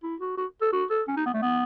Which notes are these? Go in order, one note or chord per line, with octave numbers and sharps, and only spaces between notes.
E4
F#4
F#4
A4
F#4
A4
C#4
D#4
B3
A3
B3